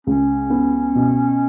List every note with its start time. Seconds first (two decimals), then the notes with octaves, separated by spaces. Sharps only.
0.07 C#2 C#4
0.50 B3
0.95 B2